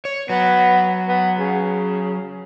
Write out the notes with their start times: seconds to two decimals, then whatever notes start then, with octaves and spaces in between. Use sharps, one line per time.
0.05 C#5
0.30 F#3 B3
1.08 B3
1.38 C#3